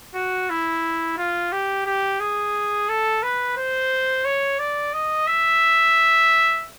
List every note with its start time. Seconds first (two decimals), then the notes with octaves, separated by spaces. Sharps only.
0.15 F#4
0.50 E4
1.18 F4
1.52 G4
1.86 G4
2.20 G#4
2.89 A4
3.23 B4
3.57 C5
4.25 C#5
4.59 D5
4.93 D#5
5.27 E5